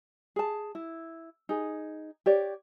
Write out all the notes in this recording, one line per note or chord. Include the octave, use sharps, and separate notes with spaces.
G#4 A5
E4
D#4 G#4
G4 C#5 D5